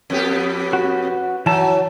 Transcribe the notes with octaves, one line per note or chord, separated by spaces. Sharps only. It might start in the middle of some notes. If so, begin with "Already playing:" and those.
F2 B3 G4
F#4
E3 F#3 A5